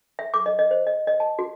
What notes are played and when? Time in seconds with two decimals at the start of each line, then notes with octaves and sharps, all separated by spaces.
0.19 E5
0.34 D6
0.46 D#5
0.59 D#5
0.71 C5
0.87 D#5
1.07 D#5
1.20 A5
1.39 F#4